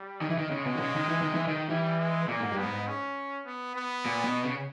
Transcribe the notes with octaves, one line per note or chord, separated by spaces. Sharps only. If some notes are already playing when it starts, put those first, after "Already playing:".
Already playing: G3
D#3
E3
D#3
C#3 G#3
B2
D#3
C#3
D#3
E3
D#3
E3
D#3
E3 G3
G#3
A#2 A#3
G#2
G2
B3
G#2
C#4
B3
B3
A#2
B2
C#3